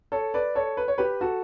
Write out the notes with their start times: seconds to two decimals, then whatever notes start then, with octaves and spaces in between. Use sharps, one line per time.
0.12 A4 C#5
0.34 B4 D5
0.55 A4 C#5
0.77 B4
0.88 C#5
0.98 G4 B4
1.21 F#4 A4